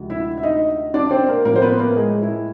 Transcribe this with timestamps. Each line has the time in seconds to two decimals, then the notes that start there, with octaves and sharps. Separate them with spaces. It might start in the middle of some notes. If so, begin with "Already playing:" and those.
Already playing: D2 C3 F3 G#3
0.10 E4 E5
0.38 E5
0.43 D#4 D#5
0.94 D4 D5
1.11 C4 C5
1.28 A#3 A#4
1.45 A2 F3 A3 A#3 A#4
1.56 C5
1.62 B3 B4
1.79 A#3 A#4
1.96 G#3 G#4
2.22 E4